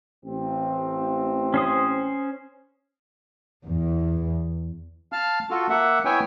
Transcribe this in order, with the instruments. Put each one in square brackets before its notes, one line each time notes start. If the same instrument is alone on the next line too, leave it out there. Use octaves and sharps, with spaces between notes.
[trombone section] A1 C4
[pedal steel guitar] C#4 C5 D#6
[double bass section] E2
[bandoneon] F5 A5 F6
F4 F#4 A4
A#3 E5 F#5
B3 E4 C#5 E5 G5 G#5